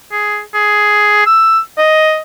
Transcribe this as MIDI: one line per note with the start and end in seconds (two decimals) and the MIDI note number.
0.11 0.40 68
0.54 1.24 68
1.26 1.59 88
1.78 2.20 75